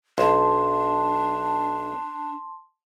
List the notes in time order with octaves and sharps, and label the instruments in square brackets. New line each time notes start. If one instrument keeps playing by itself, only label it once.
[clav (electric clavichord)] B1 [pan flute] D4 [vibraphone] A5 C6